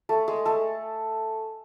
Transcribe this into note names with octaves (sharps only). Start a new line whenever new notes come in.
A3 A4
G#3 G#4
A3 A4